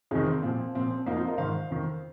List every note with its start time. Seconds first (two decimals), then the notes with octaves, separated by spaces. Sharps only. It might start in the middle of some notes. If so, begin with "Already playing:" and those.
0.11 F2 C3 D#3 D#4 G#4
0.26 C4
0.42 A#2 F3 C4
0.75 A#2 F3 C4
0.91 C4
1.06 F2 F3 A#3 D#4
1.17 C4 F4
1.27 A#4 D#5
1.38 G#2 D#3 C5 F5
1.70 F2 D#3